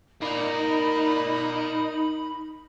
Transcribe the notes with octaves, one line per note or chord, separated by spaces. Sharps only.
D#4 A#4 D5 B5